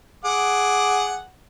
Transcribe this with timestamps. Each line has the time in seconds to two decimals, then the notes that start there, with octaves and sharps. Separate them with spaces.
0.25 G#4 F#5 D6